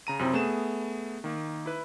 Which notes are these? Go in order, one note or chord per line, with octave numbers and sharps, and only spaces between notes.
C#3 A#5 D#7
F#2 C3 C4 E4
A3 B3 G#4 E7
D#3 A#3
E4 B4